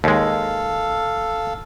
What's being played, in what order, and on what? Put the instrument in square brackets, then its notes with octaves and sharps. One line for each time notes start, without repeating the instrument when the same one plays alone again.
[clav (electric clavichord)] D#2 G#3 [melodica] A4 F5